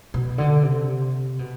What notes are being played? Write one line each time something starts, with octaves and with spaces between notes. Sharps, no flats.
B2
D3
C3
B2